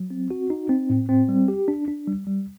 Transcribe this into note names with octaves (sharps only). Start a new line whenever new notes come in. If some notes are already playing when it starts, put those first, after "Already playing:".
Already playing: F#3
C4
F#4
D#4
C4
A2
C4
G3
G4
D4
D4
G3
G3